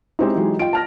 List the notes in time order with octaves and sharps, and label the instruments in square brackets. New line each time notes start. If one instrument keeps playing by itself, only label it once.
[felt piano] G#3 C4 C#4 [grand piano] D#4 E4 G4
[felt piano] E3 F#3 G#3
[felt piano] F4 D#5 G5 [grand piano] D7
[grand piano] A5 F6 A#6